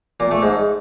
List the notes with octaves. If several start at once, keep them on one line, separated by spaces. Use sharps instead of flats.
A#2
A3
G#2